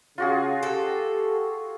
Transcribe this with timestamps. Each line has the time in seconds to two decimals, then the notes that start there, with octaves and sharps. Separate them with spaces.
0.18 C#3 F4 F#4 G#4
0.63 G4 A4